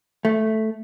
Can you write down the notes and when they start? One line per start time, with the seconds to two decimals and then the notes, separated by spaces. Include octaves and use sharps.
0.25 A3